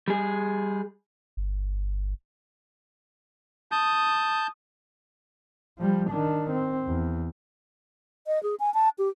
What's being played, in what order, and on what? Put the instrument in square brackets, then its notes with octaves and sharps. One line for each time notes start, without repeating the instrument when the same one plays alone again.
[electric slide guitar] G3 G#4
[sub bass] G1
[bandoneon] A5 G6 [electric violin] D#6
[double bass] F3 G3
D#3 D4
C4
E2
[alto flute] D#5
G#4
G#5
A5
G4